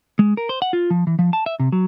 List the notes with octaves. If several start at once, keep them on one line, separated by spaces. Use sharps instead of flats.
G#3
A#4
C5
F#5
F4
F3
E3
F3
A5
E5
C3
F#3